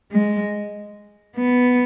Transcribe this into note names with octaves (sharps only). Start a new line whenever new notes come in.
G#3
B3